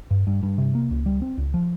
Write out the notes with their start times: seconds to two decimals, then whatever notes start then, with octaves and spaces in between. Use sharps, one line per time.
0.11 G2
0.27 G2
0.43 G2
0.58 C3
0.75 A#3
0.91 C#2
1.06 G3
1.22 C4
1.38 C#2
1.54 F3